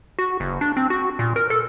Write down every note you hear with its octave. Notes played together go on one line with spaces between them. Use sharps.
F#4
F#1
D4
C4
F#4
A#2
A#4
A4